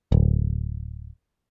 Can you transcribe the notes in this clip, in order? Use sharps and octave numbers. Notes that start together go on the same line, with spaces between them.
D1